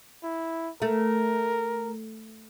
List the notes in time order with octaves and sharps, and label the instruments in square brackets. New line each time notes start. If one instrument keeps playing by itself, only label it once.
[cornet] E4
[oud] A3 [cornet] A#4